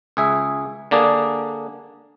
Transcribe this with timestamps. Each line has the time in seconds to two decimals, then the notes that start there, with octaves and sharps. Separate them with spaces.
0.17 C#2 G#4 E5
0.91 D3 A#3 D4 G#4